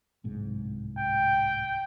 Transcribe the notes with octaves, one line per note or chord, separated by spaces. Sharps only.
D1 C2 G#2
G5